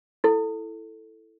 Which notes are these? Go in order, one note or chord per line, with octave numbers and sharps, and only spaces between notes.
E4 A4